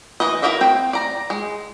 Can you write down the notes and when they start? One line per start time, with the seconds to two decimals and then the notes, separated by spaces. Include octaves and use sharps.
0.20 E3 B4 D#5
0.42 E4 F#4 A#4 D#5 E5
0.61 C4 G5
0.93 D5 A#5
1.30 G#3